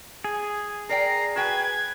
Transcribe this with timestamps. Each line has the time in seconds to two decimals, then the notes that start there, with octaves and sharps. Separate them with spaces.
0.24 G#4
0.89 A#4 D5 G5 A#5 C7
1.36 F#4 B4 G5 G#5 G#6